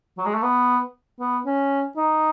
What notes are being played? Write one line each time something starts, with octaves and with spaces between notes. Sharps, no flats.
F#3
G#3
A3
B3
B3
C#4
D#4